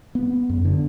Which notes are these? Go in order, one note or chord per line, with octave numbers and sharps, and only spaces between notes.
B3
F#2
D3